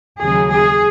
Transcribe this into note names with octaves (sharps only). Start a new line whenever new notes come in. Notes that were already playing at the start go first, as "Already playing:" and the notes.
D#2 C#3 F#3 G#4
G#4